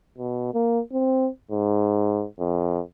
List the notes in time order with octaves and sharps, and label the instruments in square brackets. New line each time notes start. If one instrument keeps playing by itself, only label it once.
[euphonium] B2
A#3
C4
G#2
F2